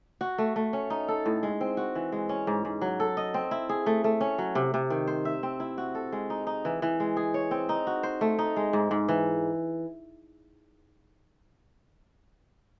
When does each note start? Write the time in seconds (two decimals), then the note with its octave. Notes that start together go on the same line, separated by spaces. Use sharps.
0.21 F#4
0.38 A3
0.56 A3
0.73 C#4
0.90 D#4
1.08 A4
1.26 A2
1.43 G#3
1.61 C4
1.77 F#4
1.95 E3
2.12 G#3
2.29 C#4
2.47 G#2
2.65 G#2
2.81 F#3
3.00 A4
3.17 D#5
3.34 C4
3.51 E4
3.69 G#4
3.86 A3
4.04 A3
4.21 C#4
4.38 F#3
4.55 C3
4.74 C3
4.90 D#3
5.07 C5
5.25 E5
5.43 C4
5.60 E4
5.78 F#4
5.95 A4
6.12 G#3
6.30 D#4
6.47 D#4
6.65 E3
6.82 E3
7.00 G#3
7.17 G#4
7.34 C#5
7.51 C4
7.69 D#4
7.87 F#4
8.03 C5
8.21 A3
8.39 D#4
8.56 G#3
8.73 G#2
8.91 G#2
9.08 E3